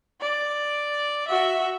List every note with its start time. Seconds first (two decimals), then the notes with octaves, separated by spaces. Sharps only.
0.22 D5
1.28 F#4 E5